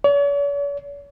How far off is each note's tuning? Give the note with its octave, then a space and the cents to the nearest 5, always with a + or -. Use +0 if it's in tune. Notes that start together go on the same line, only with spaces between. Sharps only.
C#5 +45